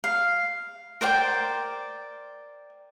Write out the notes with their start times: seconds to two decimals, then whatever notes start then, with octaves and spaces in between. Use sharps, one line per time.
0.04 F5
1.01 A#4 C5 D5 G5